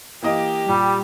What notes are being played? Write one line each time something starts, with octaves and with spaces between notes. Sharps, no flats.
E3 A#3 G4 D#5
A#2 G3